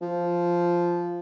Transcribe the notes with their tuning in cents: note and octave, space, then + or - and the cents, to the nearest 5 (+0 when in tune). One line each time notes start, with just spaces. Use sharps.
F3 -5